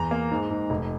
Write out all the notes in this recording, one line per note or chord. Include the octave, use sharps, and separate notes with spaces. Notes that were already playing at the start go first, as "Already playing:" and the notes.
Already playing: E2 A#5
A#3
G#2
G#2
F1